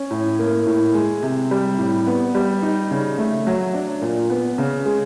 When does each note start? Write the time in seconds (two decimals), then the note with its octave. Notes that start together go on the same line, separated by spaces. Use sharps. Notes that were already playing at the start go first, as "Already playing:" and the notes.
Already playing: C#4
0.10 A2
0.39 A#3
0.67 A2
0.94 G#3
1.23 C3
1.51 G3
1.78 A2
2.07 B3
2.35 G3
2.62 D#4
2.91 C#3
3.18 A3
3.47 F#3
3.74 D4
4.02 A#2
4.30 B3
4.58 C#3
4.86 G#3